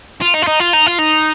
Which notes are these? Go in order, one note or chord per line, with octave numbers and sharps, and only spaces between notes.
F4
D#4
F4
D#4
F4
D#4
F4
D#4